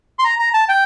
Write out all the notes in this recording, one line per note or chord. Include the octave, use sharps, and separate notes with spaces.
C6
A#5
A#5
A5
G5